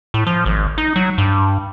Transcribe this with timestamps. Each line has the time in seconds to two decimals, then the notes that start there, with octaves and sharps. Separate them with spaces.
0.14 A2
0.27 F3
0.46 G#1
0.78 D#4
0.96 F#3
1.18 G2